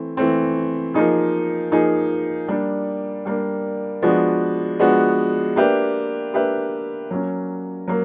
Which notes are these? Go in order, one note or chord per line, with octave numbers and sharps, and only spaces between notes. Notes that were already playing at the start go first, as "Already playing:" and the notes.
Already playing: E3 A3 C4
E3 A3 C4
F3 A#3 D#4 G#4
F3 A#3 D#4 G#4
G3 A#3 D4
G3 A#3 D4
F3 G#3 B3 D4 F#4
F3 G#3 B3 D4 F#4
A#3 D4 G4 B4 E5
A#3 D4 G4 B4 E5
F#3 A#3 C#4
F#3 A#3